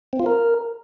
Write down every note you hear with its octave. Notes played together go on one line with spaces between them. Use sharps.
C4
F4
A#4